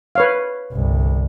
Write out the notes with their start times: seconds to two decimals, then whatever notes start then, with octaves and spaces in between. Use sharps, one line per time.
0.15 B4 C#5 F5
0.72 G1 C2